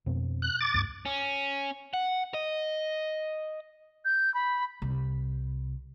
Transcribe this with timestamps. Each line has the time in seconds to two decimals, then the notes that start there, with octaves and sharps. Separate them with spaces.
0.06 F2 B2 C4
0.42 F#6
0.61 D6 A6
0.74 C#2 G2
1.05 C#4
1.94 F#5
2.34 D#5
4.05 G6
4.34 B5
4.82 C2